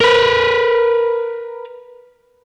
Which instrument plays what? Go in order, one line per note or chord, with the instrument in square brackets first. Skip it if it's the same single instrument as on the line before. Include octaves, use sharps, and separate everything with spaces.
[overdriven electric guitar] A#4 B4